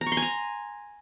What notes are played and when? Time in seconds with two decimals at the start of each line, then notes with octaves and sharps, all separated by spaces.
0.01 A#5
0.06 C#6
0.12 C6
0.17 G#5
0.22 A#5